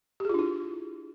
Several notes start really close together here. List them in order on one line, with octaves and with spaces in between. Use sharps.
G4 G#4 F4 D4 E4